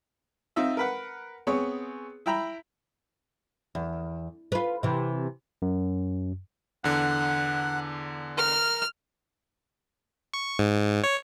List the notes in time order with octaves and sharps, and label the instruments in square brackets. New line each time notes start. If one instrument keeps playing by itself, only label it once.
[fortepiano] C4 D#4 F4 E5
A#4 B4 F#5
B3 C4 G#4 C#5
E4 E5 G5 A#5 B5
[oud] E2
F4 B4
C3 E3
[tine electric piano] F#2
[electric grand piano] E2 D3 [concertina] F#5
[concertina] A#4 [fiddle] F6
[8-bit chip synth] C#6
G#2
C#5